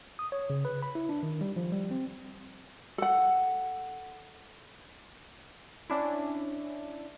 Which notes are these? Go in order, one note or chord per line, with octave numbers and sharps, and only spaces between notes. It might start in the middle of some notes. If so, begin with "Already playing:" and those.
D#6
C#5
C#3
B4
B5
E4
D4
D#3
G3
F3
G3
C4
A4 F#5
C#4 D4 E4